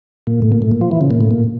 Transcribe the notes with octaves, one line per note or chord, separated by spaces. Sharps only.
A#2
A2
A#2
A2
A#2
F3
E3
C#3
A#2
A2
A#2